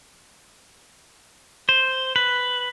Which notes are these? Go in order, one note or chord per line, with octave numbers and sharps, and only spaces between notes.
C5
B4